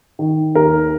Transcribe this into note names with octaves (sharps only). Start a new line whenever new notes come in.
D#3
D#2 A#4